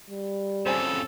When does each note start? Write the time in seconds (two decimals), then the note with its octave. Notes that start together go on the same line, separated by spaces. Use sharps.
0.10 G3
0.66 F2 C#3 A4 C5 G#5